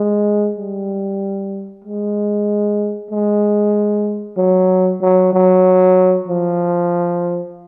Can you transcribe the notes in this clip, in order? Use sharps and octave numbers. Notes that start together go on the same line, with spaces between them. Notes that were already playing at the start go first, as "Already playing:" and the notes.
Already playing: G#3
G3
G#3
G#3
F#3
F#3
F#3
F3